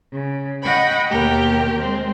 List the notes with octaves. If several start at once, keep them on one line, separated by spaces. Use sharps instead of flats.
C#3
D#5 F#5 G5 B5 C#6
D#2 B2 G4 A#4
G#3 C4